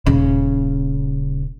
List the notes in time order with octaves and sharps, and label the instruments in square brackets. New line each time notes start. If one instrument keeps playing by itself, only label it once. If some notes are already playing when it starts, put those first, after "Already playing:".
[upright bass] D#1 C#3